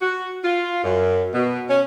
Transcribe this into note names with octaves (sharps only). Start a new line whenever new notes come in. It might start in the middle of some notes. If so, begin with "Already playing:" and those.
F#4
F4
F#2
B2
C#4